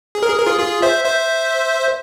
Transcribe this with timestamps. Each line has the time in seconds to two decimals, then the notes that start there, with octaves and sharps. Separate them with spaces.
0.15 G#4
0.23 A#4
0.30 G#4
0.38 A#4
0.46 F4 G#4
0.59 F4 G#4
0.82 C5 E5
1.04 C5 E5